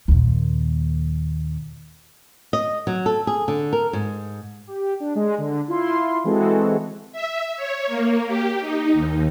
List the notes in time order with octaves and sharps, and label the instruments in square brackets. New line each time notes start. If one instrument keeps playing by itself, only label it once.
[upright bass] D#2 A#2
[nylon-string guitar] D#5
F#3
A4
G#4
D3
A#4
G#2
[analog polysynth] G4
D4
G#3
D3
E4 F4 C6
E3 G#3 C4 F#4 A4
[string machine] E5
C#5
A#3
G4
D#4
D#2